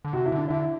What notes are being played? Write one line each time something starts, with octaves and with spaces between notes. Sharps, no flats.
D3
C3 F#4
E4
D3 D4
D3 E4